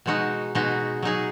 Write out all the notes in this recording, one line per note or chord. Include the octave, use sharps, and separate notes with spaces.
B2 G#3 D#4 F#4
B2 G#3 D#4 F#4
F#3 D#4 G#4